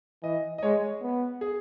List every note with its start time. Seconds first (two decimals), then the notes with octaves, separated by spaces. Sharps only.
0.23 E3 D#5
0.58 D#5
0.63 G#3 C#5
1.02 B3
1.41 G#4